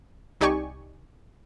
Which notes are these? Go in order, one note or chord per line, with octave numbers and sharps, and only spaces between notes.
C2 D#4 G4 D5 G#5 C#6